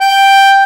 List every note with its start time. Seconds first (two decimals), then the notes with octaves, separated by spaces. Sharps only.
0.01 G5